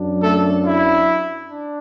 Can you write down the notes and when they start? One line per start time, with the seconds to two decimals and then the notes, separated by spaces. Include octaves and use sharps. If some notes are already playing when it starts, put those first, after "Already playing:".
Already playing: F#2 F#3 D4
0.22 A3 A4
0.65 E4
1.50 D4